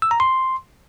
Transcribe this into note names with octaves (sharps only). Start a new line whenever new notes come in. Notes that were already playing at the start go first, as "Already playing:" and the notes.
E6
A#5
C6